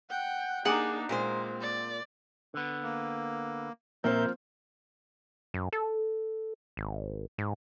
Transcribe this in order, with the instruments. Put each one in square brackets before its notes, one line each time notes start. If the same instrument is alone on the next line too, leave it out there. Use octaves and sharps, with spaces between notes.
[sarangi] F#5 [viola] G5
[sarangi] A#3 [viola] D4 D#4 [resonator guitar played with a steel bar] G#4 [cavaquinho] F#5 D6
[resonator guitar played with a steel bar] A#2 A#3 C5 [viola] G#3 [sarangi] C4
[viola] D5
[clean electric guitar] D3 B3
[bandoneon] A#3
[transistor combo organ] A#2 A#4 E5 [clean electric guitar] F3 [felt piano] A#3 C4 C5 [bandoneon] G6
[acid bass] F#2
A4
G#1
G#2